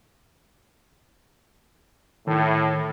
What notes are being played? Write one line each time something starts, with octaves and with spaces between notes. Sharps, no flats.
A2 D#3